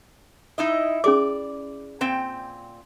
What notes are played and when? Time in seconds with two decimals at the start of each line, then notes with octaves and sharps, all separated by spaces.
0.58 D#4 E4 D#5
1.04 C#4 G#4 D5 D6
2.01 A#2 C4 G5